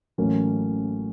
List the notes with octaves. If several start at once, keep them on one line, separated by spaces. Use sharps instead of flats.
A1 A2 F#3 A#3 C#4